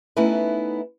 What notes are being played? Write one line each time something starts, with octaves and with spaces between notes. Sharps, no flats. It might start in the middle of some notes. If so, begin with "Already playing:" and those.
A3 B3 C#4 D#4 E4 B4